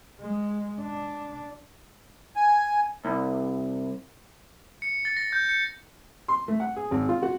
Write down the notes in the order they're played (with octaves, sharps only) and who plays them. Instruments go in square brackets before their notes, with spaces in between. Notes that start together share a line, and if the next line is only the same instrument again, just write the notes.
[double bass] G#3
D4
[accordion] G#5
[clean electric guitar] C2
[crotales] C#7
A6
A#6
G6
C#7
[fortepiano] C6
A3
F#5
G#4
G#1
F4
F#4